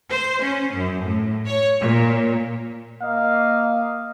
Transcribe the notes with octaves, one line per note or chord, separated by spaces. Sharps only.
C5
C#4
F#2
A2
C#5
A#2
A#3 D#5 F5